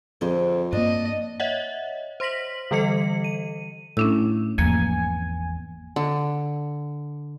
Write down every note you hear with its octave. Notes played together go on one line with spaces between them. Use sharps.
F2 D3 G#4 C5
G2 A#3 D4 D#5
C#5 D#5 E5 F#5
C5 C6 A#6 B6 F#7
D3 E3 G3 A4 D#5 C#7
D#7
A2 C#4 D4 E6
G#1 E2 F3 A#3 G#5
D3